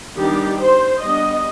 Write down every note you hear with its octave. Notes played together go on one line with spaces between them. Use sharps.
D#3 G3 B3 D4 G4
C5
G3 B3 D4 D#5